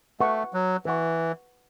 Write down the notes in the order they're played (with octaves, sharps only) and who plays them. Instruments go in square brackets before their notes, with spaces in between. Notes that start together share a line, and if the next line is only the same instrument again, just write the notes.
[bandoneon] A3 [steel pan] B4 F#5 C#6
[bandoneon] F#3
[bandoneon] E3 [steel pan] B4 F#5 C#6